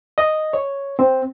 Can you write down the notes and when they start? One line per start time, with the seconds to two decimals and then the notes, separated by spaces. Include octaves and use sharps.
0.18 D#5
0.53 C#5
0.99 C4